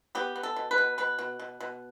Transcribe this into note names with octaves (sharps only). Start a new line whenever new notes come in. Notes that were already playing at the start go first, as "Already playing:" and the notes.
B3 G4
B3
A4
B2
B4
B2
B2 B4
B2
B2
B2